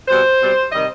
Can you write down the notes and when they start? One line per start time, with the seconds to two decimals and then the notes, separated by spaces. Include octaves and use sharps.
0.08 B2 G3 C4 C5
0.40 B2 G3 C4
0.72 C3 D#3 G3 D#5